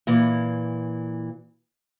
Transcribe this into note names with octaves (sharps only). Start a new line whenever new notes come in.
A#2 E3